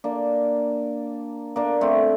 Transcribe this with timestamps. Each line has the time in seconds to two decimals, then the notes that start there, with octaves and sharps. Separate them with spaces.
0.04 A#3 D4
1.56 A#3 D4
1.81 A3 C4